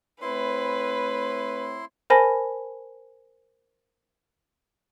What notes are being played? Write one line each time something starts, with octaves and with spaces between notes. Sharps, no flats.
A3 C4 E4 B4 C#5 C6
A#4 C5 G#5 A5 B5 A#6